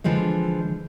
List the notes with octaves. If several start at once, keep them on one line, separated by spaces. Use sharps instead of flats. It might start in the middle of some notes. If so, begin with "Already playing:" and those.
D3 E3 F3 G#3